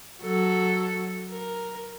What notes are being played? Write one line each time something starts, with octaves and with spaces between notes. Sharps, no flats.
F#3 A4
A#4